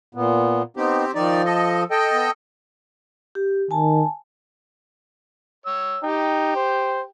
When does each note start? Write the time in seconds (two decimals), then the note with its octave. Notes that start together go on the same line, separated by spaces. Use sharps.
0.15 A#2 B3
0.77 B3 C4 D#4 G4
1.15 D#3 F3 D#4 D5
1.45 A4 D#5
1.91 A4 D#5 G5
2.12 B3
3.35 G4
3.71 D#3 G#5 A5
5.66 C#5 E6
6.04 D#4 G4 G5
6.56 C5